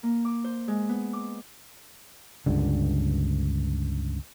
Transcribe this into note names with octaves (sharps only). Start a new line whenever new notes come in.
A#3
D6
C5
G#3
B3
D6
C#2 G2 D3